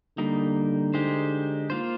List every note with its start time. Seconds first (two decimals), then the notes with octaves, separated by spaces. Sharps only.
0.17 D3 G3 A#3 D#4
0.94 G#3 D#4 G4 C5
1.70 A#3 F4 C5